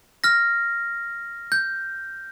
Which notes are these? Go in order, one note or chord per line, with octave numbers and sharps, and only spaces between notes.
F6 A#6
G6